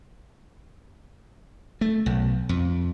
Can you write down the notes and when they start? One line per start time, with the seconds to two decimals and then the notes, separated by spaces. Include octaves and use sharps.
1.81 A3
2.06 B1
2.49 F2